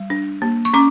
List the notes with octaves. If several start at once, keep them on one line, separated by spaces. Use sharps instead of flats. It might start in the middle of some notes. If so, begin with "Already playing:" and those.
Already playing: G3
D4
A#3
C#6
C#4 A#5 D6